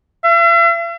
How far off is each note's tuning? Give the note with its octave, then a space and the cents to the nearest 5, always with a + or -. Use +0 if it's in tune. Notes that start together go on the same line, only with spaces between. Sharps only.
E5 +45